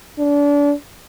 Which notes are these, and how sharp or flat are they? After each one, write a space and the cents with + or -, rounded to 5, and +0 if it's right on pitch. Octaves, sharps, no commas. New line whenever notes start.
D4 -30